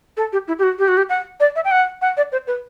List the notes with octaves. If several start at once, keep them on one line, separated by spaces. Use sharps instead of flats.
A4
G4
E4
G4
F#4
G4
F#4
G4
F#5
D5
E5
G5
F#5
F#5
D5
C5
B4